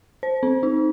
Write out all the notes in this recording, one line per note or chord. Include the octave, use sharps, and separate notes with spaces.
C5
C4
D#4